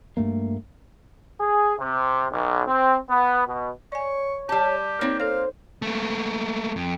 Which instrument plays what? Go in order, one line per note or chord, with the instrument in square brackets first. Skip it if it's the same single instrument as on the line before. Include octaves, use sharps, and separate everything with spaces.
[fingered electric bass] G2 A3 A#3
[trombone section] G#4
C3
B1
C4
B3
B2
[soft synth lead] C#5 [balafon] D5 G#5 [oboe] C#6
[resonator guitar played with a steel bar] G3 A5 [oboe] G4
[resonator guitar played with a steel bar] A#3 C4 [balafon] D#4 C#5
[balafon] A4 C#5 [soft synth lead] C5 [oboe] F5
[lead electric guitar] A3 A#3
F2